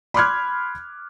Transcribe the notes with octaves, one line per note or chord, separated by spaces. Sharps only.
B5 C6 D6 F6 F#6 G#6